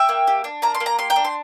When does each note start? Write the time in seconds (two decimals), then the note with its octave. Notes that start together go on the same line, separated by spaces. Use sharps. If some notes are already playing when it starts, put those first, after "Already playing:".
Already playing: E5 G5
0.09 A#3
0.27 G4
0.44 D4
0.62 A#3 A#5
0.74 C6
0.80 A#3
0.86 A#5
0.98 G4 C6
1.10 G5 A#5
1.16 D4
1.25 C6